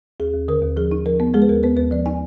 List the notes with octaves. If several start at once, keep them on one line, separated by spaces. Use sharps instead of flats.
D#2 G#4
D#2
D3 A#4
D#2
F3 G#4
D#4
F3 A#4
B3
G#3 G#4
B4
D#2 A#4
B3 B4
D#2 B4
F3 D5
D#4 G#5